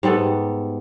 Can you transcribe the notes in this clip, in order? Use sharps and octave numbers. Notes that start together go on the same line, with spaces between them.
G#2 G3 B3 A4